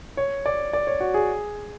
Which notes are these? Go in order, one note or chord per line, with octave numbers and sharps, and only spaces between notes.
C#5
D5
D5
C#5
F#4
G#4